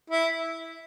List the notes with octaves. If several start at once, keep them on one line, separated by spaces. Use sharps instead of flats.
E4